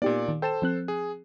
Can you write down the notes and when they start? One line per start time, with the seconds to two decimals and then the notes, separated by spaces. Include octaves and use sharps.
0.02 A#2 B3 D#4 G4 D5
0.29 D#3
0.42 A4 C5 G5 A5 E7
0.62 F3 C4 F#6
0.88 G#4